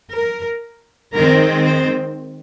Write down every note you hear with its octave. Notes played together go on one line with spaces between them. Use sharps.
A#4
D#3 G#3 C4 A#4
C5